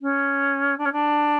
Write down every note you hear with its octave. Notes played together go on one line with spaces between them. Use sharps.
C#4
D4
C#4
D4